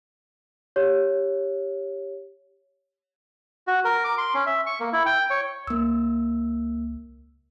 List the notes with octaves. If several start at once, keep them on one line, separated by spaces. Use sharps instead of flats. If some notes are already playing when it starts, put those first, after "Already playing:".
G4 C#5
F#4
A#4
D6
C6
C#4
E5
C#6
A#3
E4
G5
C#5
C#2 A#3 E6